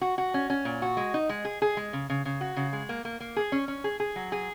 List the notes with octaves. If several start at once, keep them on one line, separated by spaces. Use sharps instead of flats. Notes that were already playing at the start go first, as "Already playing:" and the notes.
F#4
F#4
C#4
C#4
A#2
F#4
G#3
D#4
G#3
G#4
G#4
G#3
C#3
C#3
C#3
F#4
C#3
G#3
A#3
A#3
A#3
G#4
C#4
C#4
G#4
G#4
F#3
G#4